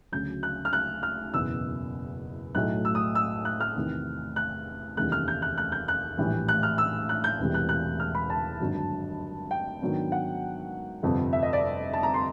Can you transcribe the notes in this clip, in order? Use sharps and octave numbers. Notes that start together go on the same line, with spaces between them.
D2 C#3 F#3 G6
F#6
F6
F#6
F6
F#1 E2 B2 E6
B1 A2 F#3 A3 F#6
E6
D#6
E6
F#6
F6
E2 C3 D#3
F#6
F1 D#2 C#3 E3 G3 F#6
F6
G6
F#6
F#6
G6
F#6
A#1 A2 E3 G3
F#6
F6
E6
F#6
G6
E1 E2 C3 E3 G3
F#6
F#6
F6
B5
A5
G#1 G2 D3 F#3
G5
G#2 D#3 F#3 B3 D4
F#5
G1 F2 C3
E5
D#5
D5
A5
A#5
C6